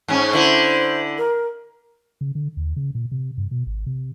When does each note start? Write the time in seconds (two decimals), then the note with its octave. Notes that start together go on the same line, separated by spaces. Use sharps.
0.08 G#2 C#4
0.33 D3 E4 C5
1.18 A#4
2.21 C#3
2.35 D3
2.57 D#2
2.76 C#3
2.95 A#2
3.11 C3
3.38 G2
3.51 B2
3.66 G#1
3.86 C3